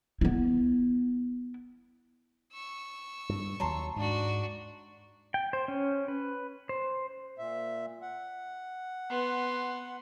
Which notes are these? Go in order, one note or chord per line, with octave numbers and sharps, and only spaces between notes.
B3 E4
C#6 E6
G2
D#2 F#3 A5 A#5 C6
G#2 D4 F#4
G5
C5
C#4
B4
C5
A#2 E5
F#5
B3 C6